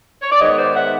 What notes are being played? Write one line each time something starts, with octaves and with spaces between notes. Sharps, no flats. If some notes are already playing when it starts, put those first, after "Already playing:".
C#5
D5
G#2 D#3 G#3 B3 C#5 D#5
C5 D5
E5 F#5